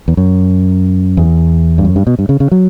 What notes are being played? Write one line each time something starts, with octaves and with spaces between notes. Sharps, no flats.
E2
F#2
E2
G2
F#2
G2
B2
G2
C#3
C#3
F#3